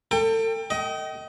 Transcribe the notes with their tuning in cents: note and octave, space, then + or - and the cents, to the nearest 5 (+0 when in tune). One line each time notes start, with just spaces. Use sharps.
A4 +35 G5 +25
D#5 +20 G5 -30